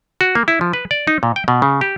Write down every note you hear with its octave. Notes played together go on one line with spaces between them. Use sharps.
F#4
A#3
E4
F3
B4
D5
D#4
A#2
G5
B2
C#3
G4